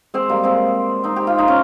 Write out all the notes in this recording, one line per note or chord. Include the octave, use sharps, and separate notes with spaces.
G#3 C4
G3 A#3
G#3 C4
C4 D#4
G4
F4
D#4
C#4